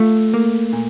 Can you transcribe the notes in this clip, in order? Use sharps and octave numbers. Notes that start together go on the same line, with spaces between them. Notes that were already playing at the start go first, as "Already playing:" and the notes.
Already playing: A3 F4
A#3
A#2